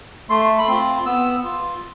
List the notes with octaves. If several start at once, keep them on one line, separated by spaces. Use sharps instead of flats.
A3 C6
B5
C4 F4 C6
B3 E6
F4